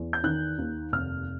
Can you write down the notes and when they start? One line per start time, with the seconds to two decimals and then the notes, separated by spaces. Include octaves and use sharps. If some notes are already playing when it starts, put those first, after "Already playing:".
Already playing: E2
0.13 G6
0.24 D#3 F#6
0.58 D#2
0.92 F1 F6